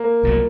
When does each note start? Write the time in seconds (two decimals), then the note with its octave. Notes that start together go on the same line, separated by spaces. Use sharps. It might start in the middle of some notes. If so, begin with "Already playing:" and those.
Already playing: A#3
0.23 C2 A#2 F#3